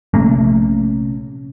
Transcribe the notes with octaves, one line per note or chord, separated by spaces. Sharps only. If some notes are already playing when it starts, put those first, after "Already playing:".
A#1 C3 A3 A#3 C#4